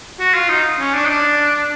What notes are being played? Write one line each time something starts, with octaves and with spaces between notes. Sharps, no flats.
F#4
F4
D#4
C#4
D4
D#4
D4